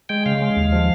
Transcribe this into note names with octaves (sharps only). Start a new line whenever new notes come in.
G#3 G5
C#3 F5
G#3
D#2
F3